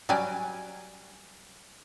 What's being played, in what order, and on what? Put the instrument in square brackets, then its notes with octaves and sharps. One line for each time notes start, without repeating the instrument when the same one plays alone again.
[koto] F#3 G3 D5 G#5